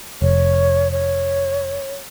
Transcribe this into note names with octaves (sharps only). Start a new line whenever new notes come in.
F1 C#5
C#5